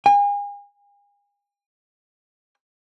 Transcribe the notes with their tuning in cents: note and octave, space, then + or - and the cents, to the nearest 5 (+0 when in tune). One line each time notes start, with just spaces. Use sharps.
G#5 -40